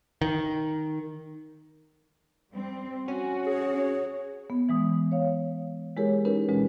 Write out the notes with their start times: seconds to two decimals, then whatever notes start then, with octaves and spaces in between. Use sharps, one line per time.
0.22 D#3
2.53 G3 C4
3.08 C#4 F#4 G#5
3.46 G#4 C#5
4.50 B3
4.69 E3 G#3 D#6
5.12 C#5 F5
5.97 G#3 E4 G4 G#4 A#4 C#5
6.25 C#4 D#4 G4 A#4 B4
6.49 D2 B2 E3 G#3 C#4